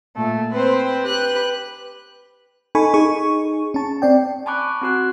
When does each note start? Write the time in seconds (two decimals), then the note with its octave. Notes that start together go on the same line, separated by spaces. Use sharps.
0.16 A#2 A3
0.51 C4 B4 C5
1.03 G4 B4 F#6
2.75 D#4 A4 G#5 B5 C#6
2.94 D#4 G#4 C#6
3.74 C#4 A5
4.02 C4 D5 G5
4.46 G#5 A5 B5 C#6 D6 F#6
4.82 C4 F#4 F#6